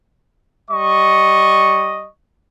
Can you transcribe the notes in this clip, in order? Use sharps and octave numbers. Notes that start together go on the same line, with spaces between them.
G3 D#5 C#6